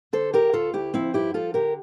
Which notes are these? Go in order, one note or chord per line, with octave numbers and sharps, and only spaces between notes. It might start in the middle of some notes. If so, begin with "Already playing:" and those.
D3 A4 C5
D2 G4 A#4
D2 F4 A4
D2 E4 G4
F3 C4 E4
G2 E4 G4
F3 F4 A4
D3 G4 A#4